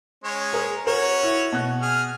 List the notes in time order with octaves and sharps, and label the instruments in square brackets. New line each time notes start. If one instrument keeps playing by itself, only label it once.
[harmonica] G#3 C#4 C#5
[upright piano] G#4 A#4 A#5
[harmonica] C#4 F#4 C#5 [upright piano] A#4
[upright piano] E4
B2 F#6
[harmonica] G#4 F6